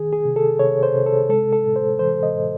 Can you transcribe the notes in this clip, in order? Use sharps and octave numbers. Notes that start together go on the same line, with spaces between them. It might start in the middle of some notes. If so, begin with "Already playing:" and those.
Already playing: D#3 G#4
G#4
C3
A4
C3 C#5
C5
C3
A4
G#3 A4
A4
A2
C5
E3 C5
D#5
A2